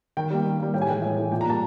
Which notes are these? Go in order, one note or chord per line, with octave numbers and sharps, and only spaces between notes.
D#3 G5
G3 A#3
D#3
G3 A#3
A2 G5
G#5
E3 G#3 G5
A2
E3 G#3
A#2 G5
A#5
G3 A#3 A5